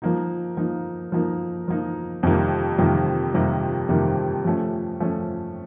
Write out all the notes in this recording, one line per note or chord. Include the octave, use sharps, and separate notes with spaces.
F3 A#3 D#4
F3 A#3 D#4
F3 A#3 D#4
F3 A#3 D#4
F2 C3 D#3 G3 A#3
F2 C3 D#3 G3 A#3
F2 C3 D#3 G3 A#3
F2 C3 D#3 G3 A#3
F3 A3 C#4
F3 A3 C#4